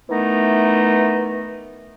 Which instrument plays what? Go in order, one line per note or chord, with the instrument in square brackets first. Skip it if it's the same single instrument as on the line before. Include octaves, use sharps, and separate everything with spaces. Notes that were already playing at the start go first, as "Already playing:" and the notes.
[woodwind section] D#3 E3 A3 B3 D#4